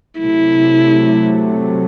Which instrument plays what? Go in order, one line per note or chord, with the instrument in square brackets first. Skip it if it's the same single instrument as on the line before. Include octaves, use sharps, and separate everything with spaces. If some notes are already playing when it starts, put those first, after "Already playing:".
[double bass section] C3 F#3 A3 [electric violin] E4